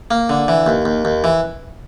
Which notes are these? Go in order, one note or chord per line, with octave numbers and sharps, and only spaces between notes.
A#3
D3
E3
D#2
D#2
D#2
E3